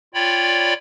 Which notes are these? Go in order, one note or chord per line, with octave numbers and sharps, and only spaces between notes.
F4 C#5 D5 G5 B5